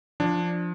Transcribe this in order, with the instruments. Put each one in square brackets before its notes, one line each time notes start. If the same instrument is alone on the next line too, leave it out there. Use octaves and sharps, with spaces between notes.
[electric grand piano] F3 D4